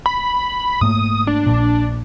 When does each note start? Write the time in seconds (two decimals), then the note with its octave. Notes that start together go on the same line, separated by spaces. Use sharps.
0.06 B5
0.81 G#2 A3 A#3 D#6
1.27 D4
1.46 A#1 A#2